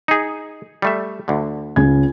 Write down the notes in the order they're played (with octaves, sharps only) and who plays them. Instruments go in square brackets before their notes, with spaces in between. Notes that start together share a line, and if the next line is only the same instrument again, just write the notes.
[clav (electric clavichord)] D#4 G#4
G3 A3 E5
D2 D3
[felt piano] C#2 C#4 G#6